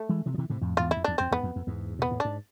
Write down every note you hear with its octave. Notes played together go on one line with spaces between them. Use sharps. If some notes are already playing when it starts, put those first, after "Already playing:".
Already playing: A3
E3 G#3
C3 E3
F3
C3 E3
A2 C3
F2 A2
E2 G#2 F4
E4
F2
E2 D4
F2 C4
E2 G#2 B3
F2
F2
E2 G#2
B2 B3
A2
G#2 D4